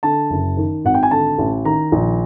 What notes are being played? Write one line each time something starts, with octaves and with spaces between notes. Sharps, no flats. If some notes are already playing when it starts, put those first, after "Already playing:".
D3 A5
F#1
D#3
G#1 F#5
G5
G#5
D3 A5
A1
D#3 A#5
A#1